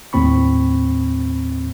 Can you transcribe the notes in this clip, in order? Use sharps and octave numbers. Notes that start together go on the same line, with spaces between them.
D#2 A2 C4 B5 C#6